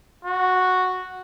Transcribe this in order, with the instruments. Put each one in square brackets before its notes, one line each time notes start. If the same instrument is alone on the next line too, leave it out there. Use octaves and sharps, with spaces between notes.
[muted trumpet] F#4